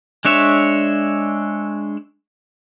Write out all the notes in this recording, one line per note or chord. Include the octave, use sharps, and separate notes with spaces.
G#3 D4 C#5 E5